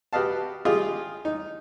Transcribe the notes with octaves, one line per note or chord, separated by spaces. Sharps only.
F#4 G4 B4 D#5 F5 A5
F4 G4 G#4 D#5
D#4